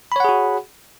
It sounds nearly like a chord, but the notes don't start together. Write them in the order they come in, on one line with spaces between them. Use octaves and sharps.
B5 C#5 F#5 G#4 F#4